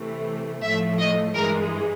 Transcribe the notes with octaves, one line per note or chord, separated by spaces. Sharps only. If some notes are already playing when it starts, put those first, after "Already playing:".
Already playing: C3 E3 A3
A2 F3 A3 E5
D#5
G2 E3 G#3 A#4